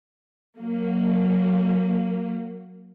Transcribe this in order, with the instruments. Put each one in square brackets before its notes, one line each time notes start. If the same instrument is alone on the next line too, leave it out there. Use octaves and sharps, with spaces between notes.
[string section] F#3 A#3